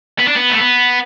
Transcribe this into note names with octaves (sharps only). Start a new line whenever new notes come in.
B3
D4
B3
A3
B3